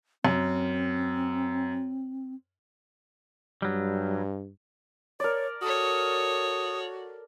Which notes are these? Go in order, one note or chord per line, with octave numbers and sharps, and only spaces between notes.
F#2 C4
G2 F#3 G3
A#4 C#5 D5
F#4 A4 C#5 D#6